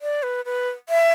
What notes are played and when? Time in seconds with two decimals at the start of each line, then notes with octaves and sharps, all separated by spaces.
0.02 D5
0.23 B4
0.45 B4
0.89 E5